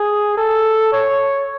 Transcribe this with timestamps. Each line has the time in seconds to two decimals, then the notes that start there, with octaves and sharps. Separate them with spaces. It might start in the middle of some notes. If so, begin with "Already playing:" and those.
Already playing: G#4
0.38 A4
0.92 C#5